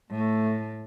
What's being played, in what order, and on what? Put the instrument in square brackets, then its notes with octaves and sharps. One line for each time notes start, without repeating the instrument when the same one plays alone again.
[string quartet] A2 [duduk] A3